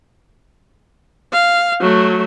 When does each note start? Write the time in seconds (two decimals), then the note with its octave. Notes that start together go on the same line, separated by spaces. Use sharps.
1.33 F5
1.81 F#3 A3